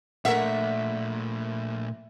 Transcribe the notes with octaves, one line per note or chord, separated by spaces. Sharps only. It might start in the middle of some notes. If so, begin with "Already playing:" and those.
A#2 A3 D4 A#4 E5 F#5